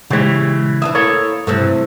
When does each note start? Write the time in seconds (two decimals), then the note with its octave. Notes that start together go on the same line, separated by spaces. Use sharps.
0.10 A#2 C#3 E3 G#3 G4 C#5
0.82 E3 D4 E4 D#6
0.95 A#3 A4 C#5
1.47 G2 C3 E3 A3